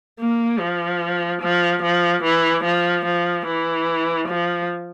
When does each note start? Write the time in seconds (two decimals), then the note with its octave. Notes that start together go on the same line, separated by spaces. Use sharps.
0.19 A#3
0.59 F3
1.42 F3
1.83 F3
2.23 E3
2.64 F3
3.06 F3
3.47 E3
4.28 F3